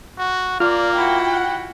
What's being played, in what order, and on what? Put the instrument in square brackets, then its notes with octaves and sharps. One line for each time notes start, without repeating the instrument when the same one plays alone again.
[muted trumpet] F#4
[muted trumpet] A#3 [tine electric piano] F4 F6 [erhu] D5
[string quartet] E4 F#4 [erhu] G5
[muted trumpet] F#5